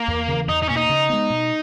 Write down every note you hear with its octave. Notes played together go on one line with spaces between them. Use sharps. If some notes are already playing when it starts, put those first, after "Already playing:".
Already playing: A#3
E2
C#3 E3
E2 D#4
D#4
B2 A#3 C#4
D#4
C#3
G#3 B3
B2